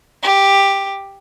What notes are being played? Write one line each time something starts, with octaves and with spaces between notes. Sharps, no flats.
G4